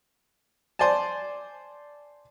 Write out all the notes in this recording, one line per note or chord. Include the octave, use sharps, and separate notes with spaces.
C5 D5 G#5 A5